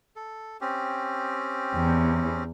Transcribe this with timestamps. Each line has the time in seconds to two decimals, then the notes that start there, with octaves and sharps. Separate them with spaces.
0.16 A4
0.61 C4 C#4 G4
1.75 E2